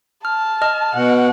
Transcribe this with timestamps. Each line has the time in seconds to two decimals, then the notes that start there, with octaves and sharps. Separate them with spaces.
0.25 A5 F6
0.62 D#5 F6
0.95 B2 F#5